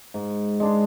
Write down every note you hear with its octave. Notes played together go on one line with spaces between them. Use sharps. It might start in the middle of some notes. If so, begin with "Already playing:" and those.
G#2
G#3 D4 G#4